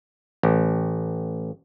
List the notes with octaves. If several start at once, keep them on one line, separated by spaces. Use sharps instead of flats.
A1